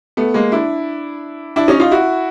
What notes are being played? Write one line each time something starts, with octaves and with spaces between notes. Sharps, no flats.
A3 B3
G#3 A#3
D4 E4
D4 E4
C#4 D#4
D#4 F4
E4 F#4